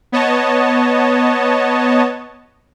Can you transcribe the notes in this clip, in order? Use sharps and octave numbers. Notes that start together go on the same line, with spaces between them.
B3 C#5 D#5 A5